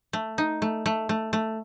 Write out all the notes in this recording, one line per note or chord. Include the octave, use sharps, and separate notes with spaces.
A3
D#4
A3
A3
A3
A3